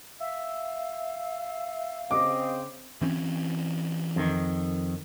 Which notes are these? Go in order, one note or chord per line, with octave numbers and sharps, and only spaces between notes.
E5 F5
C#3 C4 D#5 D6
E3 C4 C#4
F2 D#3